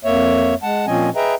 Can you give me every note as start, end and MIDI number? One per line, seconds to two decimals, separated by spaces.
0.05 0.55 41
0.05 0.55 58
0.05 0.55 73
0.05 0.55 76
0.63 0.86 56
0.63 0.86 78
0.63 0.86 81
0.87 1.10 46
0.87 1.10 53
0.87 1.10 60
0.87 1.10 61
0.87 1.10 75
0.87 1.10 80
1.16 1.35 68
1.16 1.35 71
1.16 1.35 75
1.16 1.35 76
1.16 1.35 79
1.16 1.35 82